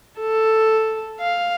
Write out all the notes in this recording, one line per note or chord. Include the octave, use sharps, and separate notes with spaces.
A4
F5